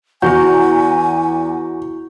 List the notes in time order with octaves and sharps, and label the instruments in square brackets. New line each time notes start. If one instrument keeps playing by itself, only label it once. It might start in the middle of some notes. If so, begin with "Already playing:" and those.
[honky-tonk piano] E2 [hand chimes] E4 C#6 G6 [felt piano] F#4 [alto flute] G#5